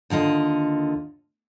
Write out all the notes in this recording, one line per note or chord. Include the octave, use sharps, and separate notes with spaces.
D#2 D3 F4 D#5